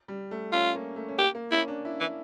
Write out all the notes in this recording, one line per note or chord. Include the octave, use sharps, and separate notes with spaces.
G3
A3
C#4 F4
A#3
A3
C#4
A#3 G4
A#3
C#4 E4
D4
E4
E3